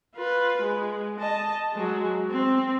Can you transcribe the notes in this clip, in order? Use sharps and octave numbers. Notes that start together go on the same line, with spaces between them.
F4 B4
G#3
D#5 A5
F#3 G#3
C4